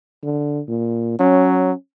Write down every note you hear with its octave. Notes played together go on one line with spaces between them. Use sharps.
D3
A#2
F#3 C#4